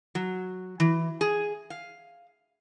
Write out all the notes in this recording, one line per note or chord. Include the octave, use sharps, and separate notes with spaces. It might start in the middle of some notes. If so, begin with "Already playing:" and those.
F#3
E3
G#4
F5